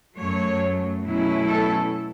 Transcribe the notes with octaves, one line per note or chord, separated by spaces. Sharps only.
F#2 F#3 A3 C#5
B2 F#3 A3 C#4 E4
A4